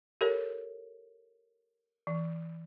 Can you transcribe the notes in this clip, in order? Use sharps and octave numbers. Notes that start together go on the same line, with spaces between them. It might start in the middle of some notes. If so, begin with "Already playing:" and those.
G4 A4 A#4 C#5
E3